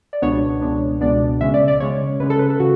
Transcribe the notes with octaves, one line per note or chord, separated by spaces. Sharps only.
D5
C#2 B2 G#3 B3 D4 C#5
C#2 B2 G#3 B3 D4
C#2 B2 G#3 B3 D4 D5
C#3 G#3 C#4 E5
D5
D5
C#3 G#3 C#4 C#5
C#3 G#3 C#4 B4
A4
B4
A4
C#3 F#4